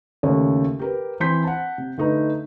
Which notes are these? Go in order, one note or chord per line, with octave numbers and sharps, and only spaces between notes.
D#2 C#3 A3 C#5
G4 A#4 B4
E3 C4 C6 G6 B6
F#5 A5
C3
D3 A3 D#4 B4